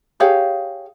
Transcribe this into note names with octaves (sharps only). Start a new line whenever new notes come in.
G4 G#4 C#5 F5